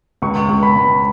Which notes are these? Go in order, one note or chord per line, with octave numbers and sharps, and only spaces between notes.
C#2 C#6
C#2
B5
C#2